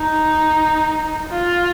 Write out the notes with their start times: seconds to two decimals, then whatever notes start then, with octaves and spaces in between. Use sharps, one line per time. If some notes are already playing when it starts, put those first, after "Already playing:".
Already playing: D#4
1.31 F4